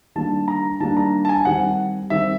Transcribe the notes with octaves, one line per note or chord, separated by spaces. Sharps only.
D#3 G3 A#3 D4 A5
A#5
D#3 G3 A#3 D4 A5
A#5
A5
G#5
D#3 G3 C4 F#5
D#3 G3 C4 E5